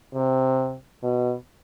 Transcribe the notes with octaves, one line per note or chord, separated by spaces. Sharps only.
C3
B2